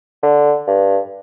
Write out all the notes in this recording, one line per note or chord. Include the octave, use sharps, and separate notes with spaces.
D3
G2